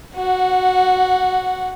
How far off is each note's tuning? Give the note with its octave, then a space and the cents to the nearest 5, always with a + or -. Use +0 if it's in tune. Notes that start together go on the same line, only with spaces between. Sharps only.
F#4 +0 F#5 -20